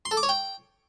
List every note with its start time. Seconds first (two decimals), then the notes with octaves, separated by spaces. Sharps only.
0.05 C6
0.11 A4
0.17 D6
0.23 C#5
0.29 G5